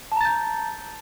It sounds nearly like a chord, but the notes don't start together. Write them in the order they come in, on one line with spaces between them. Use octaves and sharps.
A5 A#5 A6 G6